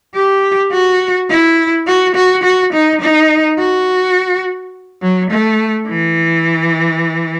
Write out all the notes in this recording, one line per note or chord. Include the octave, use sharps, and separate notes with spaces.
G4
F#4
E4
F#4
F#4
F#4
D#4
D#4
F#4
F#3
A3
E3